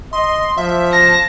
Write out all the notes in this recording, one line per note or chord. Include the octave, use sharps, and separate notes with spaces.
D#5 C6
F3 E5
A5 A#6